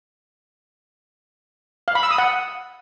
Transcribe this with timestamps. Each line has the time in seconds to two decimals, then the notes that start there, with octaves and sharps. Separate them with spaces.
1.88 F5
1.95 B5
2.03 E6
2.11 D#6
2.18 F#5